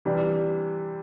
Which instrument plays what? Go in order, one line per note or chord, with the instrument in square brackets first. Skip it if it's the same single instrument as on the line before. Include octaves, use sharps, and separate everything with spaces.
[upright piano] C3 E3 G3 D4